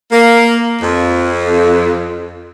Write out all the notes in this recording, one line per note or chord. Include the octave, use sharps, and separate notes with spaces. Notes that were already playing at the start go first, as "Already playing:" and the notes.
A#3
F2